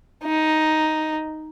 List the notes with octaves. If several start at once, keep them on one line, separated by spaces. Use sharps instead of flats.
D#4